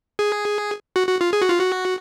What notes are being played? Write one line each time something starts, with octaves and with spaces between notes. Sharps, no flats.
G#4
F#4
F#4
F4
G#4
F#4
F4
F#4